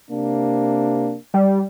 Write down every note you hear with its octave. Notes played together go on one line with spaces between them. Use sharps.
C3 A#3 D4
G3